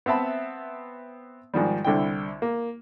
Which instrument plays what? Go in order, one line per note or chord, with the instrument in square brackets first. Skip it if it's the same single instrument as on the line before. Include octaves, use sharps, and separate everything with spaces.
[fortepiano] B3 C4 E5 A5 B5
G#2 D#3 F3 G3
C2 D3 D4 E4 G5
A#3